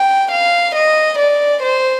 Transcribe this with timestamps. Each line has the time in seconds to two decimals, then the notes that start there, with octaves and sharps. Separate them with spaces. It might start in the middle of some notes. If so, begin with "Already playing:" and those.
Already playing: G5
0.32 F5
0.75 D#5
1.19 D5
1.63 C5